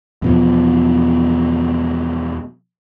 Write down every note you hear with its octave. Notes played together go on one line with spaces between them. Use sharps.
E2 B2 F3